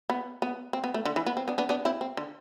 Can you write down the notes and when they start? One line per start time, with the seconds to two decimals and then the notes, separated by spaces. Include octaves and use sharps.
0.10 B3
0.42 B3
0.73 C4
0.84 B3
0.94 A3
1.05 D3
1.16 E3
1.26 B3
1.37 C4
1.48 B3 D4
1.58 B3 D4
1.69 B3 D4
1.85 C4 E4
2.01 C4
2.17 D3